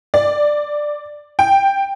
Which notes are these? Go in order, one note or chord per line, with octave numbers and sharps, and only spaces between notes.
D5
G5